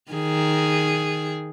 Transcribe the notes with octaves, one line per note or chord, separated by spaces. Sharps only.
D#3 G#4